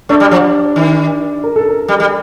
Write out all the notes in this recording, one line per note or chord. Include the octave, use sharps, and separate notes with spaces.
A3 D4
G3
F3
D#3
A#4
A4
A#4
G3
G3